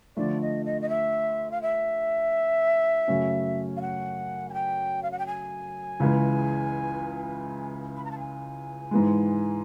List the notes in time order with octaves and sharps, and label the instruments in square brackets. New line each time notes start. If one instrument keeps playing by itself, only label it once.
[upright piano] D3 F3 A3 [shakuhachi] D5
[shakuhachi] D#5
D#5
D#5
E5
F5
E5
[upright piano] F#2 C#3 F#3 A3 C#4
[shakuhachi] F5
F#5
G#5
G5
F5
F#5
G5
G#5
[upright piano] C#2 C#3 E3 G#3
[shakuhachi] B5
A#5
A5
G#5
[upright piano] G#2 E3 G#3